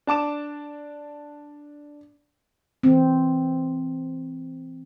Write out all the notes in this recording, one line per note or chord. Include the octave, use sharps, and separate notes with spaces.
D4 A5 D6 E7
E3 C4